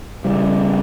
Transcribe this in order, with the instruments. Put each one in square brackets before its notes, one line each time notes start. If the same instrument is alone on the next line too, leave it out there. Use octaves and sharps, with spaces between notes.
[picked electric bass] C#3 G3